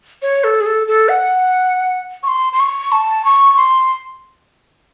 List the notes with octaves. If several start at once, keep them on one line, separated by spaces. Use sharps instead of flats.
C#5
A4
G#4
A4
A4
F#5
C#6
C6
C6
C#6
A5
C#6
C6